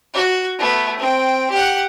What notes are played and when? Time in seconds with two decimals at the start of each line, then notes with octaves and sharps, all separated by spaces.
0.14 F#4
0.58 A3 B3
0.98 C4 G5
1.50 G4 F#5